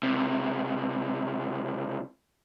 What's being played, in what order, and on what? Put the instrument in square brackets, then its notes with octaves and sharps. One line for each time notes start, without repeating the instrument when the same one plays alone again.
[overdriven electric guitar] C#2 C3